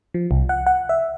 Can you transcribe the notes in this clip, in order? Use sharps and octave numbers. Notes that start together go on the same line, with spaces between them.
F3
C2
F#5
F#5
E5